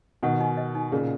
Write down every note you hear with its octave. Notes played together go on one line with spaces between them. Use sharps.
B2 D#3 F#5
D#4
D#5
D#4
A#2 C#3 G#4